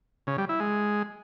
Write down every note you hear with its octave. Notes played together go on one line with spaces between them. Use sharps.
C#3
G3
E4
G#3